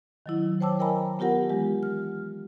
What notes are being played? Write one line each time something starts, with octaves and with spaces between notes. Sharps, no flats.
D#3 F#3 E4
C5 C#5 G5 A5 D6 E6
A#4 D#5 G5 G#5 A#5 B5
B3 F4 G4 A#4 F#5
E3 G#3 G4
F6